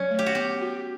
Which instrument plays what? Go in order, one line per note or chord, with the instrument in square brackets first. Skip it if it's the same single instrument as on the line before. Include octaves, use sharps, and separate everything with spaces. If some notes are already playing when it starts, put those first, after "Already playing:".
Already playing: [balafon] F#3 [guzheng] C#4
[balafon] A3
[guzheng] G4
F#4
[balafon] B3 [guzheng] G4
[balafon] F#4